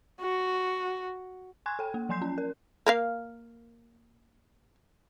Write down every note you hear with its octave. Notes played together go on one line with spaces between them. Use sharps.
F#4
G#5 C6 C#6 F#6 G#6
A4 G5
A#3
F3 F#3 G#5 C6 G6 C7
C#4
A#4
A#3 A#4 F5